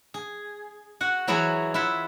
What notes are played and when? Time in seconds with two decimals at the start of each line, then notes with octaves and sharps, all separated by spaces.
0.14 G#4
1.01 F#4 F#5
1.27 E3 F#3 E4 F#4 G#4 C#5
1.74 E4 F4 E5 F#5